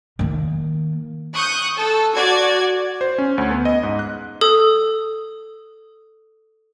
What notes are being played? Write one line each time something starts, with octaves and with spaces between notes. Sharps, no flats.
D#3 A#3
C#6 D#6 F#6 G6
A4
F#4 D5 G#6
C5
C#4
D2
B3
D#5
G#2
F#6
A4 D#6